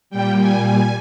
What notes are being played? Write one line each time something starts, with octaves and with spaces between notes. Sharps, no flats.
A#2 G3 G5
G#5
G#5